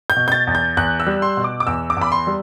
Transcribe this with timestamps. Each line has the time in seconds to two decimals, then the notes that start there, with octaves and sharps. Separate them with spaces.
0.10 G6
0.16 B2
0.28 G6
0.32 A6
0.47 E2
0.55 G6
0.77 E2 F#6
1.00 E6
1.07 G3
1.22 C6
1.37 B2
1.44 D6
1.60 D6
1.67 E2 E6
1.90 D6
1.97 E2 B5
2.12 C6
2.27 G3